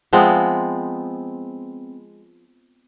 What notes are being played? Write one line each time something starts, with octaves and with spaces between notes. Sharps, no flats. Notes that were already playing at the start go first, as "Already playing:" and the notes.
F3 G#3 B3 C4